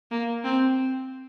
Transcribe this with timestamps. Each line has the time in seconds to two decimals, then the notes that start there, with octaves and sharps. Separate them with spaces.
0.11 A#3
0.44 C4